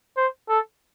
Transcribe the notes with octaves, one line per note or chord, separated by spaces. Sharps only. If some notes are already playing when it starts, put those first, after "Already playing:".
C5
A4